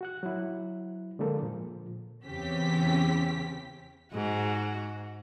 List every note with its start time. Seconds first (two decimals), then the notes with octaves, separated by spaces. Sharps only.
0.01 F#4 F#5 F#6
0.23 F#3 E4
1.19 D3 F3 G#3 A#3 A4
1.42 A#2 F3
2.25 E2 C#3 C4 C#4 G4 B6
4.13 G#2 F#4